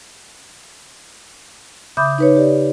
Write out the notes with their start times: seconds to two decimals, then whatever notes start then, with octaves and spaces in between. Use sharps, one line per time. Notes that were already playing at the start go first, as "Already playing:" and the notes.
1.97 C#3 E5 B5 D6 D#6 G6
2.18 D#4 B4 C#5
2.36 G4 D5